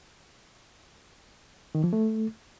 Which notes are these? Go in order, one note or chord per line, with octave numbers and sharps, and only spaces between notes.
D#3
F3
A3